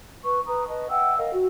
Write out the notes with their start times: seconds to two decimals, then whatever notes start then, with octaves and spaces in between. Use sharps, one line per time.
0.24 B4 C#6
0.47 B4 A#5 D#6
0.68 B4 D#5 A5
0.90 E5 F#5 G5 E6
1.19 A#4 D#5 F5
1.33 F#4